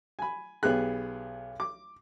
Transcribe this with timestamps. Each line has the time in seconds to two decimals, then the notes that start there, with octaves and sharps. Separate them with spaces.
0.19 G#5 B5
0.63 B1 B3 G4 G#4 F#6
1.60 D6